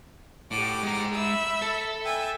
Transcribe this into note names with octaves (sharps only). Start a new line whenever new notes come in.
A2 G4 F#5 D6
G#3 A#5
E5 B5 E6
A4
E5 G5 G#5